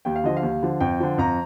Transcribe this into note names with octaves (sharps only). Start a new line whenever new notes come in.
D#2 G5
F5
D3 F3 D#5
F5
D#2
D3 F3
F2 G5
D3 F3
F2 A#5